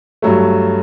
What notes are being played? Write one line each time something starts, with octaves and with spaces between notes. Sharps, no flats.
G2 F#3 A3